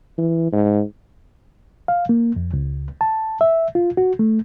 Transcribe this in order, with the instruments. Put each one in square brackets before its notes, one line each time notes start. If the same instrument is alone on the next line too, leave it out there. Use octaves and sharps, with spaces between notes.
[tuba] E3
G#2
[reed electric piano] F5
A#3
F2
C#2
A5
E5
F4
F#4
A3